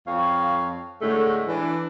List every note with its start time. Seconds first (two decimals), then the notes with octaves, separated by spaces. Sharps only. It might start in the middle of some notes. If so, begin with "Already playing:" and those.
0.06 F2 C#5 F5
1.01 A2 D3 G#3 A3
1.48 E3 D4